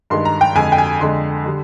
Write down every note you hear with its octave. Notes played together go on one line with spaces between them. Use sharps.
G2 D#3 G#3 C6
A#5
G5
F2 D3 G#3 G#5
G5
G#5
F2 D3 G#3 C6
D3 G3